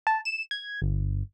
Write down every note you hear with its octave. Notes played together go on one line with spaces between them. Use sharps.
A5
E7
G#6
G1